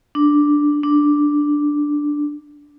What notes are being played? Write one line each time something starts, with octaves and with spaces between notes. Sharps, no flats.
D4
D4